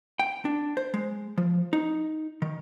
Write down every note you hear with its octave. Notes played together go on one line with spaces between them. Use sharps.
G5
D4
C5
G#3
F3
D#4
D#3